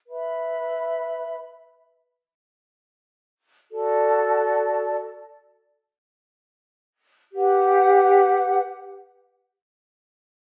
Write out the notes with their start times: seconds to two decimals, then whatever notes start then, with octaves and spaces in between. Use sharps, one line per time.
0.07 B4 E5 B5
3.70 F#4 A4 D5 A5
7.32 G4 B4 F#5